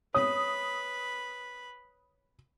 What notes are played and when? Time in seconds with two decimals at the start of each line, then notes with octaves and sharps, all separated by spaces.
0.14 B4 C#5 B5 D#6